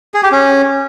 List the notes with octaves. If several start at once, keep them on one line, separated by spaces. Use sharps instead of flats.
G#4
G4
C#4